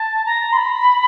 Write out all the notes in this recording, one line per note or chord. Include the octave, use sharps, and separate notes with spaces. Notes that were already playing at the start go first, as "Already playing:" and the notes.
Already playing: A5
A#5
C6
B5